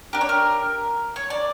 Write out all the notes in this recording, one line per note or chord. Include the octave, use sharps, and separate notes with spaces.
D4 G4 A#4
C#5
A#4
C#5
D5